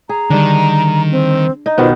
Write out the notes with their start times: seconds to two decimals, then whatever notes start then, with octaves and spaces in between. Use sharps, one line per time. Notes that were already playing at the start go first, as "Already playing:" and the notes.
0.09 G#4 A#5
0.30 D3 D#3 G3 D4
1.11 C4
1.66 D#4
1.78 B2 D#3 B3 D#4 F4 B4 C5